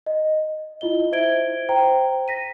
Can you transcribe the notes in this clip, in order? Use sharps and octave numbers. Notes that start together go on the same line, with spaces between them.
D#5
E4 F4 D#5 G7
E4 C5 E5 G#6 D7 G7
C5 G5 A#5
A#6 B6 D#7